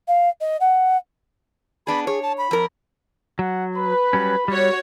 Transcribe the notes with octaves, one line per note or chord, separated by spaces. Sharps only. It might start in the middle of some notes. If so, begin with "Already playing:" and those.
F5
D#5
F#5
B3 D4 G#4 B5
G#4 C#5
A5
B5
F2 A#4
F#3 F#5
B4 B5
F#3 G3 C#4
G3 F#4 C#5